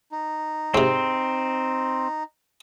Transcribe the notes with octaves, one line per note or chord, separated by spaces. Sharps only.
D#4
G#2 C3 C4